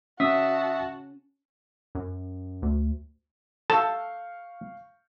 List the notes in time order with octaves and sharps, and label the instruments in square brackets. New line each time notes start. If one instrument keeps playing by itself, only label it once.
[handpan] C#4 [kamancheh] F#4 A5 [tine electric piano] E5 D#6
[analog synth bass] F#2
D2
[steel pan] A4 [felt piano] F5 C#6 G6 [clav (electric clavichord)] A5